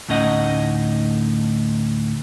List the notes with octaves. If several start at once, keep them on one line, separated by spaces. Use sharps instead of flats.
D2 A2 C#4 D#4 D#5 F#5